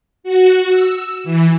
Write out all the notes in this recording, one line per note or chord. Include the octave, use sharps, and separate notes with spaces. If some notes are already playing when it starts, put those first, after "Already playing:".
F#4
E6
E3